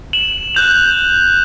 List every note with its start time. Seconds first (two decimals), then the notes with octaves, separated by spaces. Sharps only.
0.13 E7 F#7
0.55 F#6 G6 F7